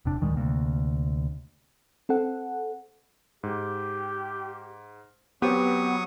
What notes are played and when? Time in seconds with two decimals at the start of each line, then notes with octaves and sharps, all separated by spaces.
0.05 E1 C3 D4
0.21 D1 D#3 G3 G#3
0.37 D2 C3 A#3
2.09 C4 A4 F#5
3.43 G#2 G4
5.42 F#3 B3 C4 G4 C5 C#6 D#6